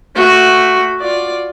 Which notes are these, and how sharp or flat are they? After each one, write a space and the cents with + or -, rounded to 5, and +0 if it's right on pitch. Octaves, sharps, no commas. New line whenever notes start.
A3 +10 F#4 +0
F4 +15 D5 +0